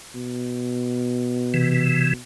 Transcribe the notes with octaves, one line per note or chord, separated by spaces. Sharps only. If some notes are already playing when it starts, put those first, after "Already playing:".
B2
C3 E3